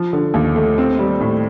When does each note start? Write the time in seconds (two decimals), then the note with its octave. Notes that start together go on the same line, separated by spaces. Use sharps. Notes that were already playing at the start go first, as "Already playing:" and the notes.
Already playing: F3
0.13 D3
0.34 D#2
0.56 A3
0.78 C4
0.99 G3
1.21 A2